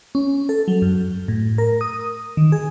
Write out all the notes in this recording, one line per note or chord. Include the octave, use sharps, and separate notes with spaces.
C#4
A4
F#3
F#2
A2
A#4
D#6
D#3
G#4